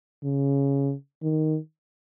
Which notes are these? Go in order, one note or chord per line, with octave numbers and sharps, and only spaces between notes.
C#3
D#3